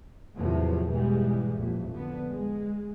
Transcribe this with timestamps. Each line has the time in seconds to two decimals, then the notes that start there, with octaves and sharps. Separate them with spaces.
0.36 E2 A2 C3 F3 F#3 A3
0.88 G#2 B2 E3 G3 G#3
1.56 A1 F2 A#2
1.92 D3 B3
2.29 G#3